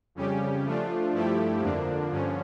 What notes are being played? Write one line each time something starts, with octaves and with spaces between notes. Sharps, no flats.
F2 C#3 G3 C#4 G4
F3 A3 D4 F4
G2 F3 A3 E4 G4
F2 D3 F3 A#3 D4
G2 D3 F3 C#4